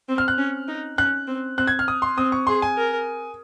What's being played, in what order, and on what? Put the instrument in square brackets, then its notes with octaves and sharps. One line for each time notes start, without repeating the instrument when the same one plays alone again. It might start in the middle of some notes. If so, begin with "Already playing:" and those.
[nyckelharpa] C4
[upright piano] F6
F#6
[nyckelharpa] C#4
D#4
[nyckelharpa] C#4 [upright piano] F#6
[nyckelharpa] C4
[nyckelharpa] C4 [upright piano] F#6
[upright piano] G#6
F6
D#6
C6
[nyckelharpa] C4 [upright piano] D#6
[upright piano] C#6
[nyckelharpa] G#4 [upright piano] C6
[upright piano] G#5
[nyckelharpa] A#4